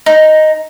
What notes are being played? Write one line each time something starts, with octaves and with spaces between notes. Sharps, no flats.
D#4